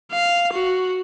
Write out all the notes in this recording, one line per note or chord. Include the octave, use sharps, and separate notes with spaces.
F5
F#4